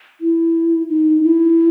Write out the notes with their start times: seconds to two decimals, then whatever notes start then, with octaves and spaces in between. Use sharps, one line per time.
0.21 E4
0.89 D#4
1.24 E4